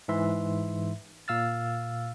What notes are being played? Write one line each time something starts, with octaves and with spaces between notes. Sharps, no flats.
G#2 E3 E5 C6
A#2 F5 E6 F6 A6